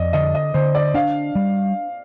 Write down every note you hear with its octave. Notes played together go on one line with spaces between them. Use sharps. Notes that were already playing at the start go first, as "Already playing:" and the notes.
Already playing: F2 D5 D#5
D3 D#5
D#5
D3 C5
D5
D4 F5
G3